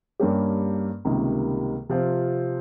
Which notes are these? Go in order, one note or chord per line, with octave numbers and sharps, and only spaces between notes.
G2 G3 A#3 C#4 G4
C#2 C3 D#3 G3 A#3
C3 F3 C4 F4